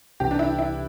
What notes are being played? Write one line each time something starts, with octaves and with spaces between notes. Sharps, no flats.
C2 C3 E3 G4
D4
E4
E4